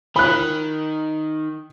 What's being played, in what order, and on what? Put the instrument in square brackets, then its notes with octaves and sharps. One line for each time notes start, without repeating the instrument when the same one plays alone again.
[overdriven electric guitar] D#3 [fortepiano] B5 F#6